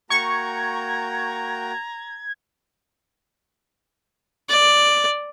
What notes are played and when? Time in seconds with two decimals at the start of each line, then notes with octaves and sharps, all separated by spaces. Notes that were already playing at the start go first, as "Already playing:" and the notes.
0.10 A#3 F#4 G5 A#5 C#6 G#6
4.49 D5